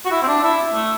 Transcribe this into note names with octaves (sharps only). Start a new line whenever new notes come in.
F#4
E4
C4
D4
E4
A3